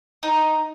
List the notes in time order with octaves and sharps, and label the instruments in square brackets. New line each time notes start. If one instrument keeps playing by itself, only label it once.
[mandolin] D#4